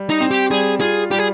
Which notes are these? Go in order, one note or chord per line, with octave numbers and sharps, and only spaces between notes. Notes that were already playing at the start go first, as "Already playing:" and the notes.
Already playing: G3
D#4
C4
G4
G3 G#4
F4 G#4
G3 G4
G#4